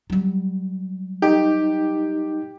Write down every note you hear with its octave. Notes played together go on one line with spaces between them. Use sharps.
F#3 G3
D#4 G4